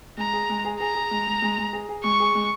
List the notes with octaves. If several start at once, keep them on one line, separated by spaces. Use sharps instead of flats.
G#3 A#5
G#4
G#3
G#4
G#4 A#5
G#4
G#3
G#3
G#3
G#3
G#4
G#4
G#3 C#6
G#4
G#3